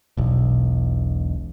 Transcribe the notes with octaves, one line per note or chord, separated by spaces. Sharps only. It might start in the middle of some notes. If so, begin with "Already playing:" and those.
E1 B1